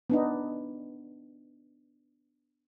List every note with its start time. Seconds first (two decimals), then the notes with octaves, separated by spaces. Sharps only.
0.10 B3 D4 D#4